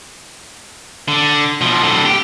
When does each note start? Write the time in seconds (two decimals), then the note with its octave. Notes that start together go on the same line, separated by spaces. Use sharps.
1.08 D3
1.61 B2 F3
1.82 A2 D3
2.05 G4